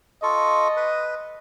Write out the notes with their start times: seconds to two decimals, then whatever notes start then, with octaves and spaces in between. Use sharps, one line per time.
0.23 F4 A4 D#5 C#6
0.76 B4